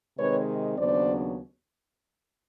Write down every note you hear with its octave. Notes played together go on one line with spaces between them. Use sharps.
C3 D#3 G#3 C4 B4 C#5
D#2 C#3 F#3 B3 D4 C5 D5